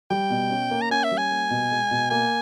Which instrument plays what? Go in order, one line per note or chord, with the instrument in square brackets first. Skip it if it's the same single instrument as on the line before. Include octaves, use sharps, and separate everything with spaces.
[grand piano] G3 [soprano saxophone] G5
[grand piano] B2
C#4
A#3
[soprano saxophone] A#5
[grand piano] C#4 [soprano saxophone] G#5
[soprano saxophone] E5
[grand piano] G3
[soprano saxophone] G#5
[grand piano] A#3
B2
G#3
B2
[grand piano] A#3 [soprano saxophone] G#5